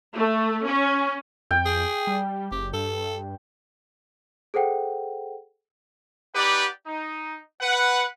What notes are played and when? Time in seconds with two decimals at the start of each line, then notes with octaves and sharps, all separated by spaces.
0.16 A3
0.65 C#4
1.51 F2 G5
1.66 G#4
2.07 G3
2.52 F#1 G4
2.74 G2 A4
4.54 G#4 A4 C5 F#5 G5
6.35 D#4 G4 B4 D5 F#5
6.87 D#4
7.61 B4 F#5